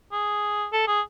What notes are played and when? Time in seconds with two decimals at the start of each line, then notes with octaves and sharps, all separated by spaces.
0.12 G#4
0.73 A4
0.88 G#4